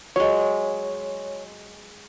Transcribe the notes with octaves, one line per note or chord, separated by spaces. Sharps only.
F#3 G#3 C#5